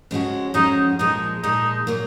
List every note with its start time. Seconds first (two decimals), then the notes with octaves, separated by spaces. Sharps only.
0.11 F2 C#3 G#3 C#4 F#4
0.54 F2 C#3 G#3 C#4 D#4 F#4
0.99 A#2 F3 G#3 D#4
1.43 A#2 F3 G#3 D#4
1.87 A#2 F#3 A#3